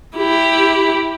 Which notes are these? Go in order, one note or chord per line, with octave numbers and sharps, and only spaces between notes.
E4 G4